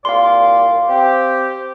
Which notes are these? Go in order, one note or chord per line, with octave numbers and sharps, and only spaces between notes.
C2 A#2 D5 F5 C6
C4 G4